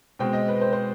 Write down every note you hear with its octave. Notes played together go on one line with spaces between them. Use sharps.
B2 G#3 C4 G5
D#5
B4
C5
C5